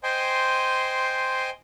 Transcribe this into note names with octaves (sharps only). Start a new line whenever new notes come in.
C5 D#5 G5 G#5 C6